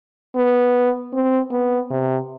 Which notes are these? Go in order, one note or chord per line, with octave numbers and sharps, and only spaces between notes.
B3
C4
B3
C3